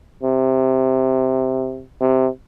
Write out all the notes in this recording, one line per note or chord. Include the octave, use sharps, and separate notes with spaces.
C3
C3